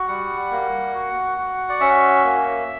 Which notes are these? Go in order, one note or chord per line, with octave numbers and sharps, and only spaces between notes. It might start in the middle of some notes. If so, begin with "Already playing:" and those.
Already playing: F#4
G3 F#5
A#3
F#4
F#4
D5
C#4 E5
A#3